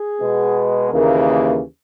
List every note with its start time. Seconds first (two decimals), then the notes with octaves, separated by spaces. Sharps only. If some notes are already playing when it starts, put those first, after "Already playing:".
Already playing: G#4
0.21 B2 G#3 B3
0.90 D#2 C#3 E3 A#3 A#4